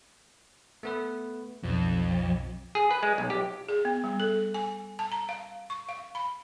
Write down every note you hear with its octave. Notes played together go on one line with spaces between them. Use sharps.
A3 B3 B4
B1 F2
G#4
B4
G#3
B1
G4
G#4
B3
G3
A4
G#5
A5
A#5
F5
C#6
F5
B5